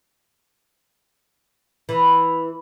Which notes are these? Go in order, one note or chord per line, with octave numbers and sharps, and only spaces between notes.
E3